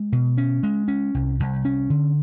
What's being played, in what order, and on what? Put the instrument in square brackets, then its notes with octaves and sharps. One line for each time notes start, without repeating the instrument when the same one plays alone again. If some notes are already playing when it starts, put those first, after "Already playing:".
Already playing: [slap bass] G#3
B2
C#4
G#3
C#4
C2
C2
C#4
D3